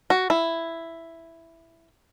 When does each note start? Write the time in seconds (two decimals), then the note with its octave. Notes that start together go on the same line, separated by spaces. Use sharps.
0.10 F#4
0.30 E4